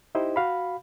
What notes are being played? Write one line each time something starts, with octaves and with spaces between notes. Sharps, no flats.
D#4 E4 G4 C5 D#5
F#4 F5 B5